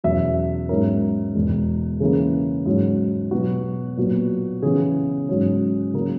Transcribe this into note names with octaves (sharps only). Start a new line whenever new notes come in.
E2 B2 F#3 C#4 E5
G#2 F#3 C#4 A#4
E2 B2 G#3
C#3 E3 A#3 G#4
G#2 F#3 C#4
B2 F#3 B3 F#4
A#2 F#3 B3
C#3 E3 B3 G#4
G#2 F#3 C#4
C#3 F#3 A#3 C#4 A#4